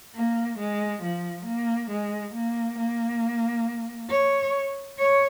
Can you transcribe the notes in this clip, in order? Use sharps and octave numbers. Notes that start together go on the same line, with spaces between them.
A#3
G#3
F3
A#3
G#3
A#3
A#3
C#5
C#5